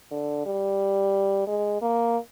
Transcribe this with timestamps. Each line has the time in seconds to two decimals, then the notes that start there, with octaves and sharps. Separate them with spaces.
0.11 D3
0.46 G3
1.47 G#3
1.82 A#3